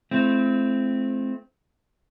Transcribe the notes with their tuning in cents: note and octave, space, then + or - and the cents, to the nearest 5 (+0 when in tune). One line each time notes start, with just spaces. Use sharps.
A3 -45 C4 -5 E4 +45